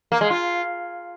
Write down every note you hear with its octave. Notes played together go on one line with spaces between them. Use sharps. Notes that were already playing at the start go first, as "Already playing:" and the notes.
A#3
G#3
F4